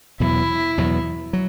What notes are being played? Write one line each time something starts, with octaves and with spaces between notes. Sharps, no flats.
E2 B2 F#3 E4
E2 B2 F#3
F#3